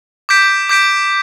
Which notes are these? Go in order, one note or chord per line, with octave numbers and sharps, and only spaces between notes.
D6 G6 B6 D7
D6 G6 B6 D7